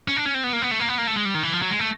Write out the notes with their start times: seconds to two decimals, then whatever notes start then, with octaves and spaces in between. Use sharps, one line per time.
0.08 C#4
0.16 D4
0.25 C#4
0.34 C4
0.44 B3
0.53 A#3
0.62 B3
0.71 A3
0.80 A#3
0.89 B3
0.98 A#3
1.07 A3
1.16 G#3
1.25 G3
1.35 D#3
1.43 E3
1.53 F3
1.62 F#3
1.71 G#3
1.79 A3